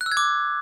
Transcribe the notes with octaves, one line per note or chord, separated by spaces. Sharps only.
F#6
E6
G#6
D6